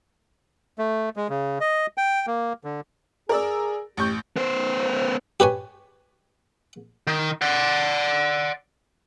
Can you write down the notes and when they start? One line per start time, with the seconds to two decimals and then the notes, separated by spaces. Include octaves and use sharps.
0.78 A3
1.16 G#3
1.30 C#3
1.61 D#5
1.98 G5
2.27 A#3
2.64 D3
3.29 G#4 A#4 D5 E6
3.97 A1 G4 C#6 G6
4.37 B3 C5
5.40 G4 B4 C#5 G#5
7.07 D#3
7.42 D5 F#5